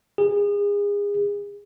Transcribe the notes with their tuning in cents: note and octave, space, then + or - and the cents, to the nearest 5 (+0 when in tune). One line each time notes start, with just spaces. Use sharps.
G#4 -30